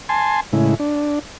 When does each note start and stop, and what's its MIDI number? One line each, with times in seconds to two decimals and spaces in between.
0.09 0.40 80
0.09 0.40 81
0.09 0.40 84
0.53 0.74 45
0.53 0.74 49
0.53 0.74 56
0.53 0.74 64
0.80 1.19 62